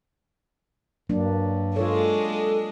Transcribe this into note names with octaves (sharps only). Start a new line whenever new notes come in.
G2 F#3 A#3 D4
G#3 D4 F4 A4 C#5